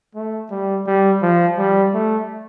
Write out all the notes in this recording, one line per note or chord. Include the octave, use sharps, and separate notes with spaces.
A3
G3
G3
F3
G3
A3